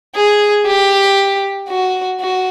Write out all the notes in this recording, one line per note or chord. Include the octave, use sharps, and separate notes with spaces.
G#4
G4
F#4
F#4